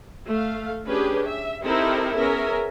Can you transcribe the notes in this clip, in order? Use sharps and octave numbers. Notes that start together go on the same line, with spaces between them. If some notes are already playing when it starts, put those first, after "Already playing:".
A3 F5
C#4 D4 G4 G#4 B4
E5
C4 D#4 E4 G4 A4 A#4
B3 C#4 G#4 A#4 E5